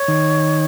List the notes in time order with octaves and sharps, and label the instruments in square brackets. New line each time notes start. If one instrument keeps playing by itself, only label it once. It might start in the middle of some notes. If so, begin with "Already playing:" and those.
Already playing: [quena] C#5
[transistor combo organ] D#3